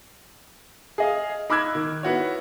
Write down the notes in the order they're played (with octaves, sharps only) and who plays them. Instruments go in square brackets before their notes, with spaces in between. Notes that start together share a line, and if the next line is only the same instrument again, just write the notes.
[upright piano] G#4 D#5 F5
D#4 B5 D6 E6 F#6 G#6
D#3
B3 E4 F#4 C#5